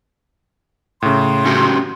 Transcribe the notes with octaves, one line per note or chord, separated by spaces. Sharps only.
A2 C#3 C6
C#4 F#4 G4